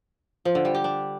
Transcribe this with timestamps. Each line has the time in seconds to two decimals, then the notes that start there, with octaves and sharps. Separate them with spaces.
0.45 F3
0.55 D3
0.65 G3
0.75 G4
0.84 D4